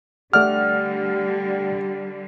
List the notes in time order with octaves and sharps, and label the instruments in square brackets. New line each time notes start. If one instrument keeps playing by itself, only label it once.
[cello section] D3 G3 [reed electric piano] A3 D5 F#5 [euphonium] G4 [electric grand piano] F6